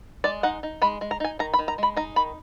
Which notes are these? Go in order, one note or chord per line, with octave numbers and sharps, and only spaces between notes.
G#3 D5
D#4 F#5
D#4
G#3 B5
G#3
A#5
D#4 G#5
D#3 A#5
B5
D#3
A#5
G#3 B5
D#4 A#5
D#3 B5